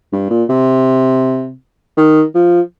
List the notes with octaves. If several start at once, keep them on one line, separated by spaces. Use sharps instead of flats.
G2
A#2
C3
D#3
F3